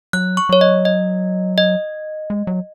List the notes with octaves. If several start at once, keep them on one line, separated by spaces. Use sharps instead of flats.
F#3 F#6
C#6
F#3 C#5
D#5
D#5
D#5
G#3
F#3